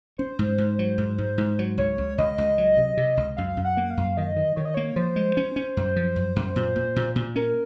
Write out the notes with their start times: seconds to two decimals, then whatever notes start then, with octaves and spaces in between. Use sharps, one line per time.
0.18 C#4 C5
0.39 G#2
0.58 G#2
0.79 F#3
0.98 G#2
1.18 G#2
1.38 G#2
1.59 F#3
1.78 C#2 C#5
1.98 C#2
2.18 C#2 D#5
2.38 C#2
2.58 F#3
2.77 C3
2.97 C3
3.17 C#2
3.37 F#2 F5
3.57 F#2
3.64 F#5
3.77 A#3
3.90 F5
3.97 F#2
4.17 D#3 D#5
4.36 D#3
4.56 D#3 C#5
4.65 D#5
4.74 A#3 C#5
4.96 F3 C5
5.16 G#3
5.37 C#4
5.56 C#4
5.77 F#2
5.96 F3
6.16 F#2
6.36 F#2
6.56 A#2
6.76 A#2
6.96 A#2
7.16 A#2
7.36 C#4 A#4